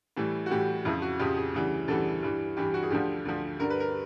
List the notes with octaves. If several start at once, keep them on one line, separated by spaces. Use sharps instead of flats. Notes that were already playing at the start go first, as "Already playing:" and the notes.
A2 E3 G3
F#4
A2 E3 G3 G4
F2 C#3 F3 E4
F#4
F2 C#3 F3 G4
G#4
D2 C#3 E3 G3
D2 C#3 E3 G3 A4
G2 E3 G3
G2 E3 G3 G4
F#4
G#4
D2 D3 F3 G4
D2 D3 F3
G2 D3 G3 A#4
B4
A#4